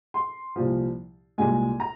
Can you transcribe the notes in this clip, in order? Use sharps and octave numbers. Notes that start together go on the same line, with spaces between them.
C6
C2 A#2 F3
C2 A#2 G#3 G#5
A#5